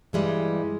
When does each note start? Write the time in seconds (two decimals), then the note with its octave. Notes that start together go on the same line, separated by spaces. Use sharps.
0.13 G2 E3 G3 G#3